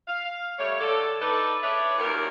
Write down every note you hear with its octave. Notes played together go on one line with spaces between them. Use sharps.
F5
G3 A3 C#5
D3 A4
D4 D#4 A4 B4
D4 G#4 B4 C#5 E5
D#2 A#2 F#3 A#4